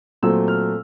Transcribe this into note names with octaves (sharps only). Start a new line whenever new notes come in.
A#2 F#3 A3 C4 E6
F6